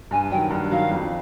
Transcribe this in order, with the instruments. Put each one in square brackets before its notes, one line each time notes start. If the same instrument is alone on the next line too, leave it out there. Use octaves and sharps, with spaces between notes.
[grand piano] G2 [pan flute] G#5
[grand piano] D#3 F#3 [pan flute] G5
[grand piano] G2
[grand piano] D#3 F#3 [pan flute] F5
[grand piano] F2